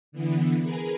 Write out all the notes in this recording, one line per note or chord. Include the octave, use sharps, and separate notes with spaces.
D3 E3 B3
G#4 A#4 B4